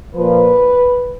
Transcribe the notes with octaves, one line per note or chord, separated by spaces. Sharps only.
A#2 F3 B4